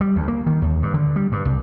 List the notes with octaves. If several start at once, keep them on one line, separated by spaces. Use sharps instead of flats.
G3
D2
A#3
D#3
D#2
G2
D3
G3
G2
C2